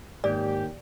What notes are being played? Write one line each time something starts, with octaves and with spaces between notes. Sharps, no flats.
D#2 G#2 G4 D5